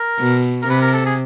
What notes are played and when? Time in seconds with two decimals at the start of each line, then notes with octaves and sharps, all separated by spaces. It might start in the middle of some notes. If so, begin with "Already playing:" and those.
Already playing: A#4
0.19 B2
0.62 A#4
0.68 C3 B4
0.81 A#4
0.93 A4
1.06 G#4